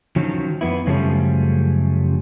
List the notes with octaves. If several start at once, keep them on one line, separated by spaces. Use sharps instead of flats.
D#3 F3 F#3 C#4
F2 B3 E4
F#2 C#3 F3 G3 A3 C#4